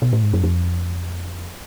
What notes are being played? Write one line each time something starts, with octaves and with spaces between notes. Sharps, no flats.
B2
A2
G#2
F#2
F2